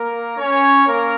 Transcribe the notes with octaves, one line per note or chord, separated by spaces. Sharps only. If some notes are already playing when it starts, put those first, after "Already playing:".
Already playing: A#3 A#4
C#4 C#5
A#3 C#4 A#4